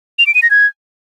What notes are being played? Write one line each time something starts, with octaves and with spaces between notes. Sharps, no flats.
F7
D7
D#7
A#6
G#6